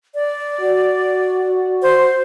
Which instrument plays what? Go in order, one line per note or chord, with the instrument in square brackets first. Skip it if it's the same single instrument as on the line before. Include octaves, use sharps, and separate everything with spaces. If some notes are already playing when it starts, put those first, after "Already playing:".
[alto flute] D5
[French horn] F#4
[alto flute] C5